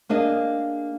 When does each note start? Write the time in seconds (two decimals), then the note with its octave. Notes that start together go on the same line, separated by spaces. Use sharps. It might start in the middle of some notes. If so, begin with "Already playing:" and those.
0.09 A#3 D4 G#4 D#5